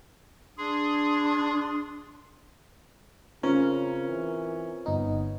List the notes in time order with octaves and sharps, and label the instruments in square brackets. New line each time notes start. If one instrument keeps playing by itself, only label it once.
[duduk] D4 [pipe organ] G#4 [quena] C6
[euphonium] C#3 [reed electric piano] C4 F4 C5 [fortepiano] C#4 [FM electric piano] A#4
[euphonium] E3
[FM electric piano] G1 D#4 [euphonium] B3